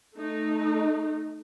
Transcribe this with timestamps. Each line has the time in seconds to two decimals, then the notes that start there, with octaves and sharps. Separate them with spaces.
0.15 A3 D#4